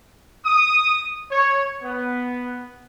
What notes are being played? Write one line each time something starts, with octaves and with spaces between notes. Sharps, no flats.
D#6
C#5
B3